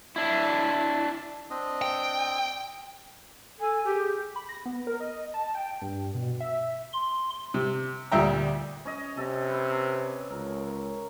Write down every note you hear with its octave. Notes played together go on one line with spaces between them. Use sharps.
D4 E4
C4 D4 D#5
G5
A4 G#5
G4 G#4
B5
A#6
B3
A#4
D#5
A5
G5
G2
B2
E5
C6
C3
D2 A#2 G3 E5 G5 A#5
C#4 C#5 D#5
C3 A4
B4
C#2 A#4